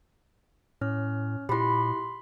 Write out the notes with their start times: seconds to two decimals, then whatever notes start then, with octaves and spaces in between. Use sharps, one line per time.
0.81 A2 C#4 C#5 F6
1.49 A#2 E4 G4 B5 C6